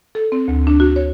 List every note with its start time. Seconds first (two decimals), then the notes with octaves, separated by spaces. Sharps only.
0.15 A4
0.32 C4
0.48 D2
0.67 D4
0.80 F#4
0.96 C#5